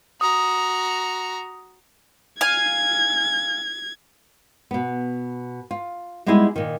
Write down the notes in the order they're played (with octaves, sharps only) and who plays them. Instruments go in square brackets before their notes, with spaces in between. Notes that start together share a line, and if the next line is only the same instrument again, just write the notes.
[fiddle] F#4 A#5 [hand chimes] D#6
[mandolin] F5 G#5 [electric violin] G#6
[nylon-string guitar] B2 B3
F4
G3 G#3 B3 D#4 E4 G#4
A#2 D#3